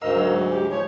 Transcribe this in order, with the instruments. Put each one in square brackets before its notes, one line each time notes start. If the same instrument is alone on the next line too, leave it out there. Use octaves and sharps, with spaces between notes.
[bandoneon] D2 G#2 [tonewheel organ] A#4 F5 E6 [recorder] D#5
[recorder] F#3
[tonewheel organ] G#3
[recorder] G4
[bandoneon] F3 [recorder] C#5